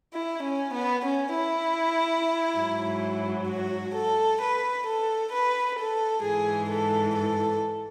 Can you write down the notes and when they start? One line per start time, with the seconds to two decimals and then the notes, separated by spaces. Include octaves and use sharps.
0.12 E4
0.43 C#4
0.74 B3
1.04 C#4
1.34 E4
2.57 G#2 F#3
3.48 F#4
3.94 A4
4.40 B4
4.86 A4
5.32 B4
5.78 A4
6.23 G#2 E3 G#4
6.69 A4
7.15 A4